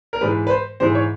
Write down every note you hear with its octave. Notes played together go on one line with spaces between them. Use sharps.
A#4
G#2 E3 G#3 B4
B4
C5
G#2 E3 G#3 C5
C#5